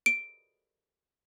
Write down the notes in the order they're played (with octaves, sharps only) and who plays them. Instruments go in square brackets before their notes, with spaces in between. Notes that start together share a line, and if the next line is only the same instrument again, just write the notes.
[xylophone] D7